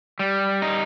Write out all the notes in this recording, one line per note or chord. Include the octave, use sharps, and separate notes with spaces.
G3
D#4